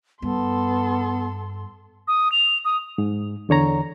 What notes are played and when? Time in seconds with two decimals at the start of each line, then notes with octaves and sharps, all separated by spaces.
0.22 G2 B3 A4 C6
2.08 D#6
2.32 F7
2.65 D#6
2.98 G#2
3.49 E2 D3 C#5 A#5